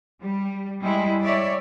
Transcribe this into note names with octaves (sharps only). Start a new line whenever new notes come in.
G3
G3 G#3 E4
C#5 D5 E5